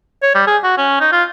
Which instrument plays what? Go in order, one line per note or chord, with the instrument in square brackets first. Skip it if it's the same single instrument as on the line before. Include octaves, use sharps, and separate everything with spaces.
[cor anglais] C#5
G3
G#4
F#4
C#4
D#4
F4